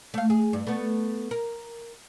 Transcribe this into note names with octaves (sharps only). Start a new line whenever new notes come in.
A3 F5
G#4
G2
A3 B3
A#4